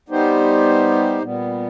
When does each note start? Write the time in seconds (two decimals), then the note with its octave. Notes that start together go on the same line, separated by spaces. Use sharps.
0.09 G3 B3 D#4 G4 C5
1.22 A#2 G3 B3